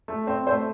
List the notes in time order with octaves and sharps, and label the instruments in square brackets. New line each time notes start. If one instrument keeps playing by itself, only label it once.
[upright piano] A3
C4
A3 C5